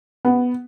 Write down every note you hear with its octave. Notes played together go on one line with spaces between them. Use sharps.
B3